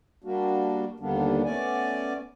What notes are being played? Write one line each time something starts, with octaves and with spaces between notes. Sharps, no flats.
G3 A#3 D4 F#4
D#2 D3 G3 A#3 B3 D4
A3 B3 C#4 D5 G#5